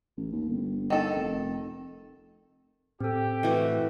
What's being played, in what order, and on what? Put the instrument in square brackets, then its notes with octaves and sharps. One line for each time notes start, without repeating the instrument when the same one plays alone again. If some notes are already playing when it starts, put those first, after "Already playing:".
[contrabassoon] A1
D#2
G1
[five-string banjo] D#3 A4
[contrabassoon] F1
[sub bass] A2 [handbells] C4 A4 [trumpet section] G4
[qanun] E3 A3 F#4